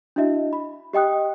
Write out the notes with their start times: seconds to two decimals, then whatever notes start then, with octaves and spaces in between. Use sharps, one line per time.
0.16 D4 E4 F#4 D#5 E5
0.53 B5
0.93 G4 D#5 G5 D#6 F#6